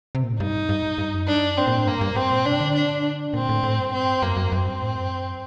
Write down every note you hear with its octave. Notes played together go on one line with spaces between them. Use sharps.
C3
A#2
A2
G2 D#4
G2
G2
F#2
G2 D4
F#2
G2 C4
A#2
A2
G2 A#3
G2
G2 C4
A#2
C3 D4
D3
D4
A#2 C4
A2
A2
G2
C4
F#2 A#3
F#2
F#2 C4
G2
A2
F#2